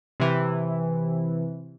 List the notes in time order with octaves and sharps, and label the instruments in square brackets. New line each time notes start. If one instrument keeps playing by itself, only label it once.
[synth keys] C3 E3